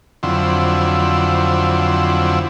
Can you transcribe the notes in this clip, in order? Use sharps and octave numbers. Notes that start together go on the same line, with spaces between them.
F2 D3 F#3 C4 E4